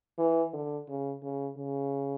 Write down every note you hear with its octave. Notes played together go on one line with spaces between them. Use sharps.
E3
D3
C#3
C#3
C#3